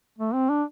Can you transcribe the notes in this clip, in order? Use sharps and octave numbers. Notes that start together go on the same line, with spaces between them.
A3
C4
D4